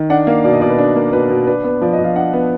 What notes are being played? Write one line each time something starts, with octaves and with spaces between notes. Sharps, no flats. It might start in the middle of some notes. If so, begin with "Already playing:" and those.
Already playing: D#3
D4 F#5
A#3 F5
B2 D5
D#5
B2 D5
B4
D4
A#3
B2 B4
B2
D4 B4
B3
F3 D5
D#5
F3
F5
D4 F#5
B3